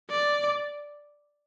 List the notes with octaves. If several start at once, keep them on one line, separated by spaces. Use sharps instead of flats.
D5